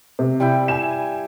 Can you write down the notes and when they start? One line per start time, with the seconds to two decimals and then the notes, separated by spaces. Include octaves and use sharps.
0.19 C3
0.40 G3 E4 G5
0.68 G#5 E7